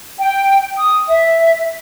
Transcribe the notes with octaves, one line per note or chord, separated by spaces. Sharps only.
G5
D#6
E5